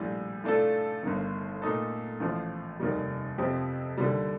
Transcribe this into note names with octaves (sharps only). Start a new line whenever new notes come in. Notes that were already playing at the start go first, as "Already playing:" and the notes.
Already playing: A#1 A2 G3
A2 A3 D4 F4 A4
G1 G2 D#3
A#2 A3 D#4 A4
A1 A2 F3
F1 D#2 D#3 G3
F2 C3 F3 C4 G4
D#2 D3 G3